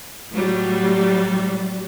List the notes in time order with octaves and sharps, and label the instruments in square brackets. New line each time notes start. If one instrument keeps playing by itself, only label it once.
[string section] A2 F#3 G3